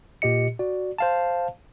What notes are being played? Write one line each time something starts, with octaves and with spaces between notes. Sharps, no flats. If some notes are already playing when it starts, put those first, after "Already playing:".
A#2 G4 D#5 C#7
F#4 D5
C5 F5 A5